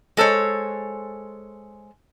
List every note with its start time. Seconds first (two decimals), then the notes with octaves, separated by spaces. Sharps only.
0.17 G#3 A4 C5 C#5